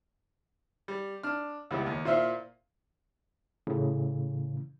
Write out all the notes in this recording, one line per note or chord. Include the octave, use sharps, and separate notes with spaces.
G3
D4 F6
C#2 E3 G3 B3
D#2
A#2 E4 C5 E5 F5
A2 C#3 E3